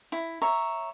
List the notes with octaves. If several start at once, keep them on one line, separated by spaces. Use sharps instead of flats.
E4
C#5 E5 A#5